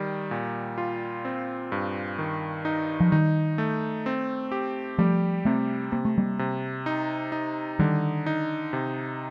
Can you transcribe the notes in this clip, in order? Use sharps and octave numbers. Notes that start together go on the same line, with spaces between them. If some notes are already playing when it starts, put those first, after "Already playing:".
Already playing: D#3 G3
A#2
F4
C4
G2
D#3
D#4
F3
D#3 G3 D#4
A3
C4
G4
F3 G3 A3
C3 A3 C4
C3 A#3
A3
G3 A#3
C3
D#4
D#4
D3 D#3 G3
D#4
C3